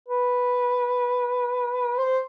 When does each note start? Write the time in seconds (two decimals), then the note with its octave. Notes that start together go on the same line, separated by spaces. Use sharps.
0.08 B4
1.98 C5